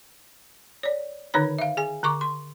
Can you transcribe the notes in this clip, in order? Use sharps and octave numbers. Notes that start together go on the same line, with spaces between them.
C#5 D5
D3 D#3 D#4 C#5 A#5
E5 F5
G#4 G#5
D3 A#5 C#6 D6
C6